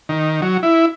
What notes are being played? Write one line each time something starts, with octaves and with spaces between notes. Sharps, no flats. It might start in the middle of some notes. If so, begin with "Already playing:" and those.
D#3
F#3
E4